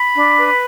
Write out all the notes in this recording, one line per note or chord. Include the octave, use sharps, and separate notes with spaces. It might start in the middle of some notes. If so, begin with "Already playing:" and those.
Already playing: B5
D4
B4